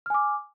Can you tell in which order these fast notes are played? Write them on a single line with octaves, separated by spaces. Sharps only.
F6 G#5 D6